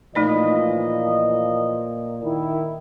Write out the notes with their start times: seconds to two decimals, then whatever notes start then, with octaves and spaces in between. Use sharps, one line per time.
0.15 A#2 E3 F3 A3 D#4 D5 D#5
2.24 D#3 E4